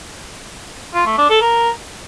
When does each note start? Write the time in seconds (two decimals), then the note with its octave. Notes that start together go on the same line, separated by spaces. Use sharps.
0.94 F4
1.06 A3
1.18 D4
1.30 A4
1.42 A#4